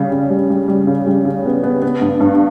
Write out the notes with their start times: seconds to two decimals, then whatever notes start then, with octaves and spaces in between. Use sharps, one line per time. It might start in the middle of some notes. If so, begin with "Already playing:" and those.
Already playing: C#3 G3
0.12 C#3
0.30 G3
0.50 G3
0.68 G3
0.87 C#3
1.06 G3
1.25 C#3
1.45 B3
1.63 B3
1.82 B3
2.01 G2
2.20 G2